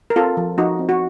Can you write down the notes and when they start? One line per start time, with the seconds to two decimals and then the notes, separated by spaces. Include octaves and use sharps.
0.10 A#4
0.16 C4 F4 A4
0.37 F3
0.58 F3 D#4 F#4
0.79 C4
0.89 F#4